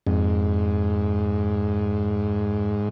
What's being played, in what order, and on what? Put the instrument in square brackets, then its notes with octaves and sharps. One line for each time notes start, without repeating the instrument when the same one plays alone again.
[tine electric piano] F2 [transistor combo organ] G#2